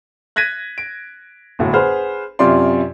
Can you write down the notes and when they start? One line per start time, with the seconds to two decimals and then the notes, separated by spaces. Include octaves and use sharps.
0.36 F#6 G#6 A#6 B6 D#7
0.78 D7
1.59 G1 A2 F#4
1.73 G#4 B4 C5 F#5 F6
2.39 F#2 C3 F4 D5 C6